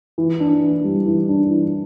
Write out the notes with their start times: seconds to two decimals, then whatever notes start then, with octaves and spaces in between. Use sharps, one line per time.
0.18 E3
0.40 D4
0.62 E3
0.84 G3
1.06 E3
1.29 D4
1.50 E3